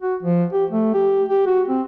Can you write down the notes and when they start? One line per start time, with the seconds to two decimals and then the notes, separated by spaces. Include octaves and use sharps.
0.02 F#4
0.23 F3
0.53 G4
0.70 A3
0.94 G4
1.29 G4
1.47 F#4
1.68 C4